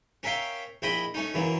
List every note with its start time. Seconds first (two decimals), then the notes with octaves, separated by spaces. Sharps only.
0.23 C#4 A#4 E5 F5 G5
0.82 A#1 E4 D#5 G5 B5 D#6
1.14 A3 C#4 D#4
1.34 F#2 E3 F#3 A#3